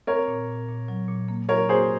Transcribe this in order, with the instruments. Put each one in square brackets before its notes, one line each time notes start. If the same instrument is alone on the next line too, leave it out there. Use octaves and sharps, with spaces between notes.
[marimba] C4 [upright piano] A#4 C#5
[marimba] A#2
A#2
A#2
F#3
A#2
A#3
[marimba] F#3 [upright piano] A#4 C#5
[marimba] A#3 [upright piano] G#4 C5